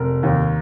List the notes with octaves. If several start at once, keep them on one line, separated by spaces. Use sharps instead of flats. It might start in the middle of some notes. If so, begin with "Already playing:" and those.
Already playing: F1 A#4
D#2